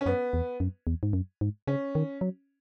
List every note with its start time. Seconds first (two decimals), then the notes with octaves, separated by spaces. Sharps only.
0.01 C#4
0.06 F#2 B3
0.33 E2
0.60 F#2
0.87 E2
1.03 G#2
1.13 F#2
1.41 G#2
1.67 C#3 C#4
1.95 D#3
2.21 F#3